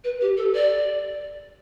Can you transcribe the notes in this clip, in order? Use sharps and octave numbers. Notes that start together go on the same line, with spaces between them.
B4
G4
A4
D5